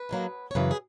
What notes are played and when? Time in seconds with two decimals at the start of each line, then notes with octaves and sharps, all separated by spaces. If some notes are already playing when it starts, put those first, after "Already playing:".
Already playing: B4
0.09 G#2 D#3 F#3 A#3
0.51 C#5
0.55 F#2 C#3 E3 B4
0.71 G#4